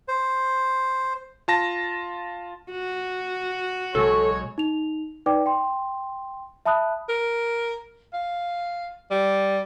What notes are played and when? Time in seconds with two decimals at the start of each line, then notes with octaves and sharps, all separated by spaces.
0.08 C5
1.48 F4 A5 A#6
2.72 F#4
3.95 B1 G#3 A4 C#5 C#6
4.58 D#4 F7
5.26 D#4 B4 D5 G5 D6
5.46 G5 C6
6.66 E5 A5 B5 D#6 F#6
7.09 A#4
8.14 F5
9.11 G3